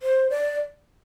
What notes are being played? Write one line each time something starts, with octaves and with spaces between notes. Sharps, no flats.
C5
D5